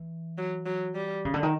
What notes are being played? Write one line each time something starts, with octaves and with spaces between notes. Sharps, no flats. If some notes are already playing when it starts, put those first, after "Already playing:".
Already playing: E3
F#3
F#3
G3
C#3
D3
D#3